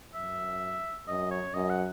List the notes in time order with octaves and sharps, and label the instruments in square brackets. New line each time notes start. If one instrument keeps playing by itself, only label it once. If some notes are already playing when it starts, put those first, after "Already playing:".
[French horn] F#2 [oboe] E5
[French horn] F#2 [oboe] D#5
[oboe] C#5
[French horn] F#2 [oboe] D#5
[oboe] F#5